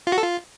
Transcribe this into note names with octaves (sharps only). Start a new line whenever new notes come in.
F4
F#4
A4
F4